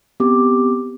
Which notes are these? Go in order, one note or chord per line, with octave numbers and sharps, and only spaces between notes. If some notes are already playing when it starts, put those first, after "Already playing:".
B3 C4 G4 D6